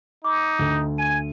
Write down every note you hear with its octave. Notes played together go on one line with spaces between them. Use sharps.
D#4 D6
D2
G#5 D#7